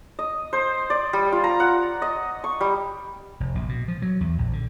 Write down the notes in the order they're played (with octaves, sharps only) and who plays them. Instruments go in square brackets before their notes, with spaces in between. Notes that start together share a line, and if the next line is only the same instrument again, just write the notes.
[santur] D#5
C5
D5
G3
F4
A#5
F#5
D#5
C#6
G3
[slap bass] F1
A#1
B2
F3
F#3
E2
A#1
D3